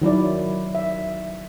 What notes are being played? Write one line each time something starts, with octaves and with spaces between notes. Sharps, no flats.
D#3 F#3 E4 D5
E5